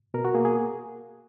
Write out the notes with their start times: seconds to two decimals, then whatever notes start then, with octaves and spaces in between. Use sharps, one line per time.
0.14 B2 A#4
0.25 F#4
0.35 A#3 G#4
0.45 G#4